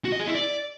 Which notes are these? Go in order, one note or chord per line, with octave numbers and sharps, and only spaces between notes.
F#4
D#5
G#4
E4
D5